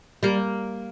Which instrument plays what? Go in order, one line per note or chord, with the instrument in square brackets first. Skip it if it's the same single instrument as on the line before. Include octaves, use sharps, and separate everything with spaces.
[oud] G3 [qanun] A#3